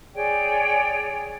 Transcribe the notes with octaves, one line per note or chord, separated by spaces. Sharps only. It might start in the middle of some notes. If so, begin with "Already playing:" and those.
G#4 C#5 D5 G5